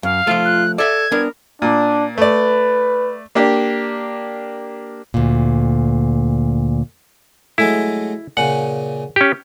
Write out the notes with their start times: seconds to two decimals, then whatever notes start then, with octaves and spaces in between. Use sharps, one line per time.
0.03 F#2 F5
0.27 F3 A3 F4
0.45 F#6
0.78 A4 D5 E5 G#6
1.12 B3 D4 A#4
1.62 A#2 D4
2.18 A3 B4 D5
3.35 A#3 D4 G4
5.14 D2 A#2
7.58 F#3 G#3 A3 E4
8.37 A#2 C#3 C#4 F#5
9.16 C#4 G4